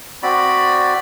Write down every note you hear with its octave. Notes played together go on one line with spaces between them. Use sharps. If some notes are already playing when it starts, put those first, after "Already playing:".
C4 F#4 D5 B5